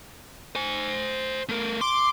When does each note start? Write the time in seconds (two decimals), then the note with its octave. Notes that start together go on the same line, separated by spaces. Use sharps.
0.55 C5 G#5
1.49 A3 A#4
1.81 C6 D6